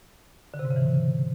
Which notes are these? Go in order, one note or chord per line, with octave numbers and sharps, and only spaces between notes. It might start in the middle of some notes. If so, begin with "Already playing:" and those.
D3
C3
G#2
C#3
E3